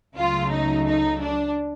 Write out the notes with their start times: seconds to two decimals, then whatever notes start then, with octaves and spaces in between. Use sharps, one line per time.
0.16 C#2 C#3 F#3 A3 F4
0.50 D#4
0.85 D#4
1.20 D4